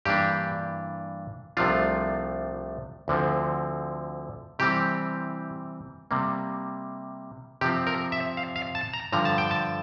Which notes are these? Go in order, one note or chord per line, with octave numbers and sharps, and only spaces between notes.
G2 E3 A#3 D4 G4
C2 C3 F3 A3 D4 F4
D2 D3 F3 C4
C3 E3 G3 C4 G4
C3 G3 A#3
C3 F3 C4 G4
A#4
E5
F5
F5
A5
A#5
G2 D3 F3 A#5
A5
G5
A5